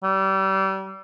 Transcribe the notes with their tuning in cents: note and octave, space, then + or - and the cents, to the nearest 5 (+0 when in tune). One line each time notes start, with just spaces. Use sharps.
G3 -30